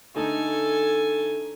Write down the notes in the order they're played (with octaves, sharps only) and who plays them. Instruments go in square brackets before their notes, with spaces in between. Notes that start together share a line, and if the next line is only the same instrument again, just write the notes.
[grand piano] D3 A3 D#4 [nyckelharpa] A4 G#5